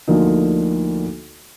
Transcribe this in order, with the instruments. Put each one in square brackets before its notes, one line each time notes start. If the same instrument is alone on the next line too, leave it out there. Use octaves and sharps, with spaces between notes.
[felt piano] D2 D3 F3 A#3 D#4